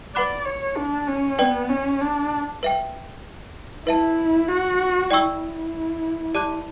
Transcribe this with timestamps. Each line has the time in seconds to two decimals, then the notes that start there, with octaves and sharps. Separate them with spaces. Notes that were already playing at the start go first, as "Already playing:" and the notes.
0.15 B4 D5 F#5 B5 D6 F#6
0.45 C#5
0.77 D4
1.08 C#4
1.39 B3 B4 D5 G5
1.69 C#4
2.01 D4
2.63 B4 E5 G5
3.87 E4 B4 E5 A5
4.48 F#4
5.10 E4 D5 G5 C#6 E6
6.35 G4 D5 A5 D6 F#6